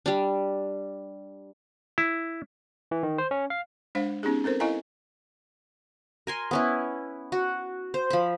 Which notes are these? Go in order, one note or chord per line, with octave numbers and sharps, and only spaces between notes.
G3 D4
E4
E3
D#3
C5
C#4
F5
G#3 D4 C5 F5
B3 C#4 D#4 G4 G#4
C4 A4 A#4 C5
E4 A4 D#5 F5 G#5 A#5
A#4 G#5 C6
B3 C#4 E4
F#4
C5
F3 B5